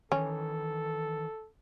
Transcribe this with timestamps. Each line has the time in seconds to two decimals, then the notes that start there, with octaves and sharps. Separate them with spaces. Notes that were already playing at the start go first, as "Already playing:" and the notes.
0.12 D#3 E3 C#4 A4